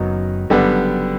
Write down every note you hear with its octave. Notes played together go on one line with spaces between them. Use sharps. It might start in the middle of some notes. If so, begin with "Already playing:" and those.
Already playing: F#1 F#2 D#3 F#3 B3 D#4
F#1 F#2 D3 G3 B3